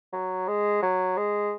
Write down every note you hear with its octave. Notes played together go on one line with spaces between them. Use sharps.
F#3
G#3
F#3
G#3